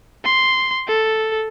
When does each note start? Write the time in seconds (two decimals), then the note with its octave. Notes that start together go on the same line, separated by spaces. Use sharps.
0.24 C6
0.87 A4